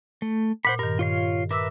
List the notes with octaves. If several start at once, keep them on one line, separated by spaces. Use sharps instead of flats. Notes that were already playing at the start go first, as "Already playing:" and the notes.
A3
A#2 C5 F#5 B5
G2 D#3 A#4
F4 C#5 F5
A#4 B4 E5 D6 E6